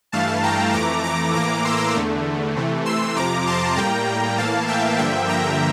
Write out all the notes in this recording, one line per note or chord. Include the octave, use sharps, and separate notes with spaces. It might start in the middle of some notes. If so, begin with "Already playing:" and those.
G2 E3 A3 F5 A5
G5 A#5
F2 E3 A3 A#5 D6
A#5 D6
A2 E3 A#3 A#5 D6
C6 E6
E2 D3 A3
C3 E3 A3
C6 E6
F2 C3 F3 A#5 D6
A5 C6
A2 G3 A#3 G5 A#5
A2 E3 A#3 F5 A5
E5 G5
G2 D3 F3 A#3 E5 G5
G5 A#5